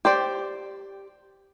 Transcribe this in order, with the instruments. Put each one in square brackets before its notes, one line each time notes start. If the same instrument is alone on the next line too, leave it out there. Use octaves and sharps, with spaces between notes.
[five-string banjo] G4 C5 D5